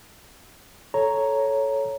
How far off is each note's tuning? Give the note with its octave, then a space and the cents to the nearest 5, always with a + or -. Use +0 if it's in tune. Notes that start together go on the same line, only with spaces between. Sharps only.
A4 -15 C#5 +0 A#5 +0